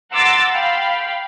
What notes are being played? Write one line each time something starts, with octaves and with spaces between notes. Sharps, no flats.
F#5 A#5 C6 D6 E6 A6
F5 G5 B5